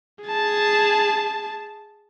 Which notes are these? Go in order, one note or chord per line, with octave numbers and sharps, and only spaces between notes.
G#4 A5